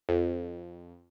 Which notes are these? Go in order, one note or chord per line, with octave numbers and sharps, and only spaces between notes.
F2